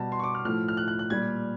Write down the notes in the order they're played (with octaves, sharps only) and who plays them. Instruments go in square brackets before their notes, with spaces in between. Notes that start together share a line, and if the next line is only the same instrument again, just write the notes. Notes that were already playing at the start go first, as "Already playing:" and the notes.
Already playing: [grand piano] B2 G3 A5
C6
C#6
D6
F6
A2 F3 A3 F6
F6
F#6
F#6
F#6
A#2 G3 G#6